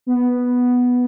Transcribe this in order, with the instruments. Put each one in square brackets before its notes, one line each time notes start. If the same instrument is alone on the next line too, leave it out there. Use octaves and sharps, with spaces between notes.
[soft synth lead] B3